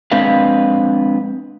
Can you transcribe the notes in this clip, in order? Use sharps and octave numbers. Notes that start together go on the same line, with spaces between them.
G#3 C4 D4 B4 D#5 F5